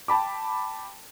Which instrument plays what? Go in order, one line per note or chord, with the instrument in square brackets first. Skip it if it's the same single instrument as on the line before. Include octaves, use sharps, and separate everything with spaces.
[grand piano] G5 A5 B5 D6